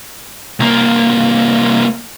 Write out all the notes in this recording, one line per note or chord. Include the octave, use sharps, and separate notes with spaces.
C2 A#3